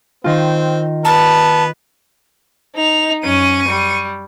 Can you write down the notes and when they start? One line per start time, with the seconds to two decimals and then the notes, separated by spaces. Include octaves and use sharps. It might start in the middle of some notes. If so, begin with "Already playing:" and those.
0.24 D#3 C4 F4
1.05 B3 B4 A5
2.76 D#4 F7
3.24 F#2 C#4 C#6 D#7
3.68 G3